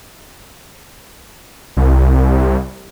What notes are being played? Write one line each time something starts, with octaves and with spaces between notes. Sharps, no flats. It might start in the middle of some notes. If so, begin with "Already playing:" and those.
C2